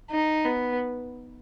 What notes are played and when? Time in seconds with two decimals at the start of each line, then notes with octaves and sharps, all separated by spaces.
0.11 D#4
0.45 B3